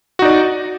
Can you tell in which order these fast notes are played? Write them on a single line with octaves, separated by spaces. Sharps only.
F#4 D#4 D5